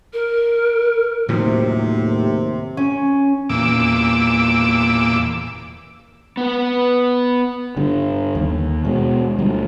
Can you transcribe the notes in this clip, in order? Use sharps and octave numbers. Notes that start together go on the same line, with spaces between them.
A#4
D#2 A2 C3 F3 F#3
C#4
E2 A#2 D6 E6
B3 B4
G2 D3
D#2
B2 G#3
D2 G3